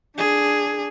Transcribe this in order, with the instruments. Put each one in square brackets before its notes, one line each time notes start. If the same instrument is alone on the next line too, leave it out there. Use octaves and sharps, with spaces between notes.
[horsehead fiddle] D4 G#4